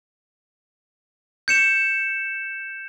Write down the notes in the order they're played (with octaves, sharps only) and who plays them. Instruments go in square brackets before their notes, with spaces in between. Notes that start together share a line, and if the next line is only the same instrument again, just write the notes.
[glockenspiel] G6 C#7 E7